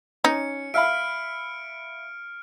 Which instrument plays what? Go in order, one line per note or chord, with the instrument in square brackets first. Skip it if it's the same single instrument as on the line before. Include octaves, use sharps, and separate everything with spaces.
[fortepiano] C#4 [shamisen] D#4 [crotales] C#7
[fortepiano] E5 F5 B5 [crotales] F6 D7